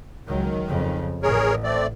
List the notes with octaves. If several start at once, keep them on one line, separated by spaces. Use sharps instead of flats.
C#2 D#3 F#3
F2 C#3
A1 G#4 A#4 C#5
A3 C4 D5